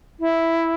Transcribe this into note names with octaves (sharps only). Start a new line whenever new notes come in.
E4